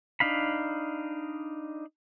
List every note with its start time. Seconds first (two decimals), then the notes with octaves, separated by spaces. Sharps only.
0.20 D4 D#4 F5 B5